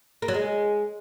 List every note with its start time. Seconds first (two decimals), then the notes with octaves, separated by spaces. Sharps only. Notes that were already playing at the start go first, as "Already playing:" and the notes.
0.22 A#3
0.28 F#3
0.34 G#3